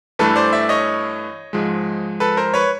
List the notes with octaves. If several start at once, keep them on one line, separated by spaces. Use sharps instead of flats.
G2 E3 A3 A4 B4
C5 D5
D5 E5
C#5 D#5
G#2 F3 G#3
A4 B4
A#4 C5
B4 C#5